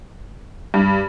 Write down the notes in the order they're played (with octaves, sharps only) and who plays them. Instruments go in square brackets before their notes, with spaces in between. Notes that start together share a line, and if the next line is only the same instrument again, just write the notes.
[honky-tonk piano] G2